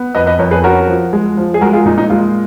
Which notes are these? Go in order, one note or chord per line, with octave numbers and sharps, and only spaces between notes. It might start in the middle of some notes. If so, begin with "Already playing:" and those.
Already playing: B3
F2 B4 D#5
B4 D#5
F2 A#4 C#5
G#4 B4
C#4 F#4 A#4
F3
G#3
F3
G#4
G#3 F#4 A#4
F4 G#4
A#2 D#4
D#4
G#3 F4